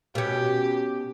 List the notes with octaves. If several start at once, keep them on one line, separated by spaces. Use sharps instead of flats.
B2 C#4 G4